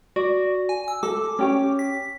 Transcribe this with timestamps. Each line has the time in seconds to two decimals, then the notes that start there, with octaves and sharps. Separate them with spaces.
0.16 F#4 D5
0.69 G#5
0.88 E6
1.03 A4 D6
1.39 C#4 G4 C#5
1.79 B6